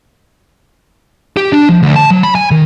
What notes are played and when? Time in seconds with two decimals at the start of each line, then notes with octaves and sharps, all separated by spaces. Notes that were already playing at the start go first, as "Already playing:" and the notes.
1.37 G4
1.53 D4
1.69 F3
1.83 D2
1.96 A5
2.11 F#3
2.23 B5
2.35 G#5
2.51 D#3